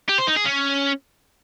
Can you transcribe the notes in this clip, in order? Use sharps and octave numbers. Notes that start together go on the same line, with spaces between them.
G4
C5
D#4
G#4
C#4